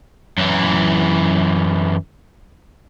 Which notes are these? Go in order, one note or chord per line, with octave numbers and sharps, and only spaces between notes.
F#2 E3